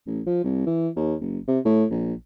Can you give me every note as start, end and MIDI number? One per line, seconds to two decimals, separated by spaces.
0.07 0.21 33
0.26 0.41 53
0.44 0.66 36
0.66 0.88 52
0.96 1.14 39
1.21 1.38 30
1.48 1.59 48
1.65 1.85 45
1.91 2.14 34